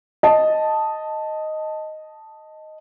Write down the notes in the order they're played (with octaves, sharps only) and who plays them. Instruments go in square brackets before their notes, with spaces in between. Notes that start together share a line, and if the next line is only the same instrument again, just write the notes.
[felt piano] D#5 A5